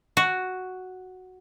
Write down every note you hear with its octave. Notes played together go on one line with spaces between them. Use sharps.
F#4